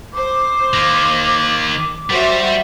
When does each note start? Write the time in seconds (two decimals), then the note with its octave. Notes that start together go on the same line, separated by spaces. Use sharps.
0.13 C5 D6
0.74 D#3 A#3
2.10 G3 F#4 C5 E5